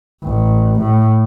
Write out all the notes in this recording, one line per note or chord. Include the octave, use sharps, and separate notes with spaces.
A1
A2